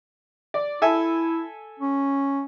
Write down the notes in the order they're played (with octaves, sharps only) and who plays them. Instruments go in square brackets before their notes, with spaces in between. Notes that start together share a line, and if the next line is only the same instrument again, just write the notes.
[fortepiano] D5
[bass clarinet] E4 [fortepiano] A4 E5 G#5
[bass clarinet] C#4